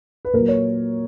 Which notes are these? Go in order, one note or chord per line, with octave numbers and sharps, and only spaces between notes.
B4
A#2 F#3 A#4
C#5